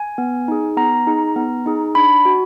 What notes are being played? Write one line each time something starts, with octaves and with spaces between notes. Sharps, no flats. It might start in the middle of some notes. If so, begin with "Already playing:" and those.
Already playing: G#5
B3
D#4 G#4
B3 A#5
D#4 G#4
B3
D#4 G#4
D4 B5
F#4